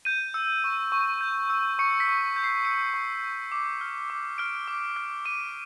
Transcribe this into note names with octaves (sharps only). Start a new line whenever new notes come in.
G6 D#7
E6
C#6
C#6
G6
E6
C#6 C#7
B6
C#6
G6
C7
E6 C#7
C#6
C#6
D6
F6
D6
F6 D7
D6
F6
D6 D#7